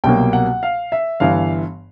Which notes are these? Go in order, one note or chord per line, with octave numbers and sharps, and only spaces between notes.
C2 B2 F#3 A#3 G5
F#5
F5
E5
G1 G2 E3 F5